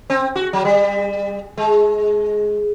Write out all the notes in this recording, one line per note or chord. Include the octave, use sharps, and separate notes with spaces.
C4
F#4
F#3
G3
G#3